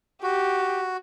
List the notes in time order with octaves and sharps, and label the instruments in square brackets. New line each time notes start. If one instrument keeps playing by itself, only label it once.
[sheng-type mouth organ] F#4 [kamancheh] G4